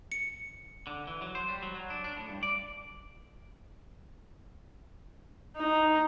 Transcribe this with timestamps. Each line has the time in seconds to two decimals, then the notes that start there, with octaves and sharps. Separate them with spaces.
0.12 C#7
0.87 D3
1.07 E3
1.22 F#3
1.35 C5
1.49 G3
1.63 F#3
1.75 F#3
1.90 D4
2.04 D4
2.17 A2
2.29 G2
2.43 D5
5.57 D#4